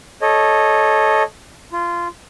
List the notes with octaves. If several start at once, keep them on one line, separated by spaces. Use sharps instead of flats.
A4 C#5 D#5
F4